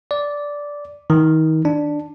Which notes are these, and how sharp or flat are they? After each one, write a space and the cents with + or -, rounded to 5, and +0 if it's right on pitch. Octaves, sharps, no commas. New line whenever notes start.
D5 -10
D#3 +30
D4 +5